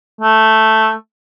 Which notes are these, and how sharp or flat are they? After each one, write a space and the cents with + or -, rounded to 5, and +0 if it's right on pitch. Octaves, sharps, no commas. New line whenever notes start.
A3 +0